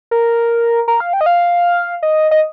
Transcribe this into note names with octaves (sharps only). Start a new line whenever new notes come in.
A#4
A#4
F5
G5
D#5
F5
D#5
D#5